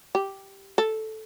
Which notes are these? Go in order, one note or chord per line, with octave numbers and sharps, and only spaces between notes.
G4
A4